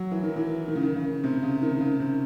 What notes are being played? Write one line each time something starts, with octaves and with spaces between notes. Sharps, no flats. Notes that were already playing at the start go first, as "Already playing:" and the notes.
Already playing: F#3
E3
D#3
E3
D#3
C#3
D#3
C#3
C3
C#3
D#3
C#3
C3